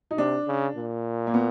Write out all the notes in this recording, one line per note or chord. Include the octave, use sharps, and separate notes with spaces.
D#4
C3 D4
C#3
A#2
A#3
B3